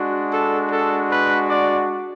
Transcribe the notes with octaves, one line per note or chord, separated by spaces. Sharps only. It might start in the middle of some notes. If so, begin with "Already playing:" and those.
Already playing: G#3 D4 F#4
A4
A4
B4
D5